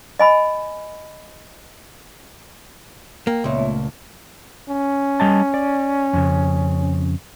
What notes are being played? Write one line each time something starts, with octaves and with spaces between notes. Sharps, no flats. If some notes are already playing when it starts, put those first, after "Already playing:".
D#5 G#5 B5
A#3 G5
C#2 A#2 B3 C#5 E5
A3
C#4
G3 D#5 A5
D5
F2 C#3